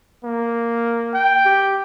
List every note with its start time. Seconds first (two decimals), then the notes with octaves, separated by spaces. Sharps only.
0.25 A#3
1.14 G5
1.46 G4